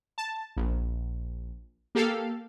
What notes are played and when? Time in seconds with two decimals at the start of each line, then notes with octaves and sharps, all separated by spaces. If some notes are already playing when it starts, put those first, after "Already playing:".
0.18 A5
0.57 A#1
1.95 A#3 G4 A4 F5